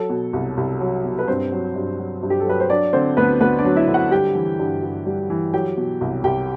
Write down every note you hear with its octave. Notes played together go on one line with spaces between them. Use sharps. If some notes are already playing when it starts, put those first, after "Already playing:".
Already playing: F#3 A4
B2
C2
C2
F#3
B2
B4
G2 C4 C5
F#3
G2
F#3
G2
G4
A4
F#3 B4
C5
F#3 D4 D5
D3 C4 C5
D2 B3 B4
D2 B3 B4
D4 D5
F#3
E4 E5
D3
F#4 F#5
G3 G4 G5
E3
G2
G2
G3
E3
F#3 G4 G5
B2
C2
C2 G4 G5